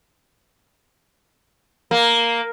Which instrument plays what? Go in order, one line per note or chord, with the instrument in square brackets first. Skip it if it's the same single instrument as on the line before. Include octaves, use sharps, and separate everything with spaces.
[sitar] A#3